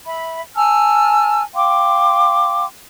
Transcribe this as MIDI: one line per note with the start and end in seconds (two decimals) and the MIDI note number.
0.06 0.41 76
0.06 0.41 83
0.56 1.43 80
0.56 1.43 81
0.56 1.43 88
0.56 1.43 89
1.55 2.65 77
1.55 2.65 79
1.55 2.65 84
1.55 2.65 86